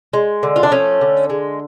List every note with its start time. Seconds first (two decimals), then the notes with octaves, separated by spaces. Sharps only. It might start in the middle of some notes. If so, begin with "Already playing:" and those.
0.13 G#3
0.43 D3
0.56 F4
0.63 D4
0.71 F3 A3 C#4
1.01 D3
1.30 G#3